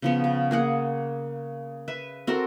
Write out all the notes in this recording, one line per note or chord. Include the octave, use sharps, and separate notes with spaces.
C#3 F3 B3
C#3
A#3 G#4 F#5
B4 E5
C4 F#4 A4 A#4